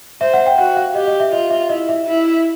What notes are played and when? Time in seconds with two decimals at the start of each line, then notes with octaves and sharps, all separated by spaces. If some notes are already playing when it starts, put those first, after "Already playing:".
0.21 C5 E5
0.33 F#5
0.46 G5
0.58 F#4 F#5
0.77 F5
0.95 G4 D#5
1.07 D#5
1.20 E5
1.32 F4 D#5
1.50 E5
1.69 E4 D#5
1.89 E5
2.07 E4